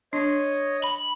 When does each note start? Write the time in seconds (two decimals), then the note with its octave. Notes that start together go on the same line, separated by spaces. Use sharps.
0.13 D4 C#5 D#5
0.84 B5